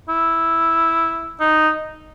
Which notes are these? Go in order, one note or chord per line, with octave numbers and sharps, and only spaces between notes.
E4
D#4